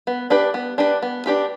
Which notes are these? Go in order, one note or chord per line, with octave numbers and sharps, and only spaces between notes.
B3
D4 G4 B4
B3
D4 G4 B4
B3
D4 G4 B4